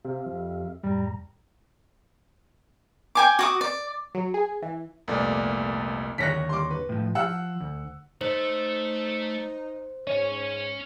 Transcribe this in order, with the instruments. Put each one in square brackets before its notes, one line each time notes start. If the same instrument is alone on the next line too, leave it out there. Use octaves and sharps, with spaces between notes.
[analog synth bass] C3 [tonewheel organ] G4 E5 F5
[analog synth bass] F2
[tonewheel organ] F2 A2 A#5 [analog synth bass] G3
[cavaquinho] G5 G#5 D6
F#4 D6 D#6
D5
[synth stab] F#3
G#4
E3
[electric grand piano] C2 F2 A#2 A3 B3 D5
[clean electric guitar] D#2 D3 C#5 [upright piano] F#6 A#6 B6
[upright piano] C6 D6
B4
[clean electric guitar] A2 F3
[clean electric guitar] F3 [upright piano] F#5 E6 F#6
[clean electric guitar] D2
[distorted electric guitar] A3 E5 [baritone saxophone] D#4 [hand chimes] C5
[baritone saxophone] G#2 [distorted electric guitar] C#4 G#5 [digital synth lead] C#5